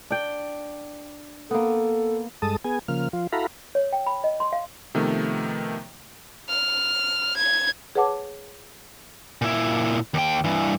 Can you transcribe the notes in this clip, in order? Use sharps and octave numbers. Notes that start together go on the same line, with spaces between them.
D4 G5
A#3 B3 A4
G2 G#3 A4 A5 D#6
B3 G#4 G#5
C#3 F3 A#3 F6
F3 F4
E4 F#4 A4 F5 A#5 B5
C#5
G5
B5
D#5
C6
F5
C3 D#3 F3 A3 B3
F6
G#6
G#4 B4 C#5 F#5 A5 D6
A#2 E4
D#2 G5
G2 E3